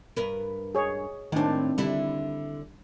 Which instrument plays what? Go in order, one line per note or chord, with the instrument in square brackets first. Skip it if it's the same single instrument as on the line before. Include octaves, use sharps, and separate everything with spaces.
[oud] G2 A#4 B4
[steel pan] G#4 C#5
[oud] A2 C4 [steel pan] D#3 D4
[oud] D3 D4 E4 [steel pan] G3